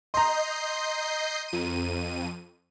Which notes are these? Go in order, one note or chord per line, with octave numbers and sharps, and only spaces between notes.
D#5 A#5 C6 G6 C7
F2 D#7